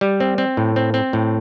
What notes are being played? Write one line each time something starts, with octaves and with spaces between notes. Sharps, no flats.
G3
C4
C4
A2
C4
C4
A2